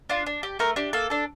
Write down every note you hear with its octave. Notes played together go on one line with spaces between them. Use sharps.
D4 F4
D4
G4
A3 A#4
D4 G4
A#3 A4
D4 A4